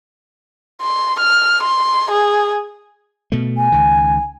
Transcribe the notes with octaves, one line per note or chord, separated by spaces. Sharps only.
C6
F6
C6
G#4
B2 A3
G#5
C#2 D#3